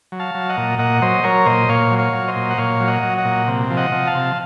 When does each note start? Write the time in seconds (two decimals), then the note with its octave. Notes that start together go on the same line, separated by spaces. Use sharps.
0.12 F#3
0.19 F5 A5
0.35 F#3
0.49 D#5 F#5
0.57 A#2
0.79 A#2 D#5 F#5
1.02 F#3 C5 D#5
1.23 F#3 A#4 C#5
1.46 A#2 C5 D#5
1.69 A#2 C#5 F5
1.91 F#3
1.98 C#5 F5
2.14 F#3
2.28 C5 D#5
2.36 A#2
2.50 F#5
2.58 A#2 C#5 F5
2.80 F#3
2.87 D#5 F#5
3.03 F#3
3.18 D#5 F#5
3.25 A#2
3.48 C3
3.70 F3
3.77 D#5 F#5
3.92 F3
4.07 F5 A5
4.15 C3